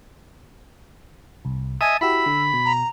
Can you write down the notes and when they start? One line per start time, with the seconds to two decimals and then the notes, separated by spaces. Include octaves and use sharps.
1.45 C2
1.81 D#5 E5 G#5 A5 D#6
2.01 E4 F#4 G4 B5 E6
2.26 D3
2.53 B2
2.65 A#5